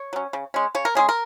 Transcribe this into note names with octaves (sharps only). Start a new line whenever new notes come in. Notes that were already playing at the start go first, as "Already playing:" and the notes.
Already playing: C#5
F#3 C#4
C#3
G#3 C#4
C#3 C#5
A#4
G#3 C#4 G#4
A#4